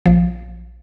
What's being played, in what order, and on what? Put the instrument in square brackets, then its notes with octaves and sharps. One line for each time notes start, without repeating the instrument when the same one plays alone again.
[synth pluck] A#1 F3